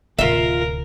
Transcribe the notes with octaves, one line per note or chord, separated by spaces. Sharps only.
D1 C3 F4 A#4 E5